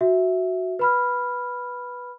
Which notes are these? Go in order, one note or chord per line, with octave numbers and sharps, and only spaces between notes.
F#4 E5
B4 B5 F6